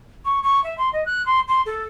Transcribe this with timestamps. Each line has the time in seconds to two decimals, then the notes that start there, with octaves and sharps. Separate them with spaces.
0.25 C#6
0.43 C#6
0.64 E5
0.78 C6
0.93 D#5
1.06 F#6
1.26 C6
1.48 C6
1.66 A4